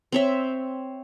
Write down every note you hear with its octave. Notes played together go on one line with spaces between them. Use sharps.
C4 C#5 E5